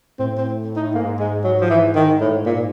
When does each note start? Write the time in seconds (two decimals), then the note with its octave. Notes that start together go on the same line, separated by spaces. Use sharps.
0.19 A2 C4
0.38 C4
0.76 D#4
0.94 G#2 A#3
1.20 G#3
1.44 F#3
1.61 F3
1.70 E3
1.95 D#3
2.21 A2
2.46 A#2